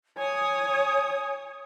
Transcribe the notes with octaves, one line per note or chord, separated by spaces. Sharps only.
C#5 G#5 D#6